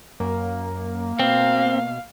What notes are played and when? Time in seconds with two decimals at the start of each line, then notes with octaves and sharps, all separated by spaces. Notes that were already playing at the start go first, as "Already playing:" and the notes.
0.20 F#2 A#3
1.19 B2 C4 F5